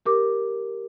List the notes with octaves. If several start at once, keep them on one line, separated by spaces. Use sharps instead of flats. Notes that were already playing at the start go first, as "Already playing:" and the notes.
G4 A#4 D6